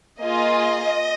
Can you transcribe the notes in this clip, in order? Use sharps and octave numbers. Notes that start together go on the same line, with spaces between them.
A#3 F4 G#4 D#5